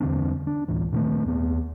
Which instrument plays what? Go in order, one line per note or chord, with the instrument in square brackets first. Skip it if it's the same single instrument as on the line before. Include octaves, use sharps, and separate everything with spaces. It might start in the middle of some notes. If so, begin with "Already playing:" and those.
[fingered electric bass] E2 D3 C4 D4
D4
A1 D2 A2 E3
A#2 D#3 F3 A3
D#2 B3